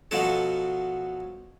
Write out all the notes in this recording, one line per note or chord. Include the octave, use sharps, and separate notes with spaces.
B2 F3 F#3 C#4 A4